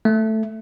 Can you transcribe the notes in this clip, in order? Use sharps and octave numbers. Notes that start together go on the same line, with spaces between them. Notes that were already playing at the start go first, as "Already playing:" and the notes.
A3